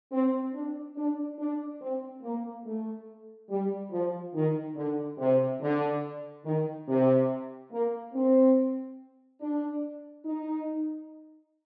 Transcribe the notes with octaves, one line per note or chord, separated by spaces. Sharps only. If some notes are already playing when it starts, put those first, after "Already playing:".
C4
D4
D4
D4
C4
A#3
A3
G3
F3
D#3
D3
C3
D3
D#3
C3
A#3
C4
D4
D#4